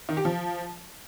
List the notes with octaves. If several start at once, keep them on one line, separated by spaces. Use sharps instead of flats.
D#3
G4
F3